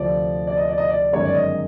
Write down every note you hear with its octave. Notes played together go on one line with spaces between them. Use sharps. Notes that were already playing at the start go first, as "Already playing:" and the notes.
Already playing: D2 C3 F3 D5
D5
D#5
D5
D#5
D5
G1 F#2 D#3 G#3 C#5
D5
D#5